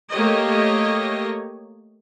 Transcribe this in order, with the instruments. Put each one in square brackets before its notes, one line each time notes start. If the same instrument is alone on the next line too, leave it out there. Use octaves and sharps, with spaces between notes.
[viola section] A3 A#3 G4 C#5 D#5